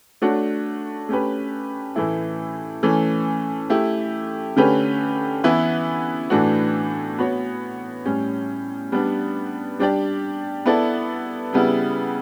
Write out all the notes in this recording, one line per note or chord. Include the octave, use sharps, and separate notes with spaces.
A3 D4 F#4 C#5
A3 C#4 G4 B4
A2 E3 A3 E4
E3 A3 C#4
A3 E4 G4
D3 A3 C#4 G4 B4
E3 B3 E4 B4
A2 E3 A3 D4 F#4
B3 F#4 C#5
A2 G3 C#4
G3 B3 D4
G3 D4 G4 D5
B3 E4 A4 D5
C#3 G3 B3 E4